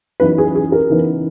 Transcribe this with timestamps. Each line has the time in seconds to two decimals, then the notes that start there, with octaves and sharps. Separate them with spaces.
0.20 F#2 E3 B3 D#4 B4
0.38 G#4
0.55 G#4
0.72 A#4
0.90 C#3 E3 B3 D#4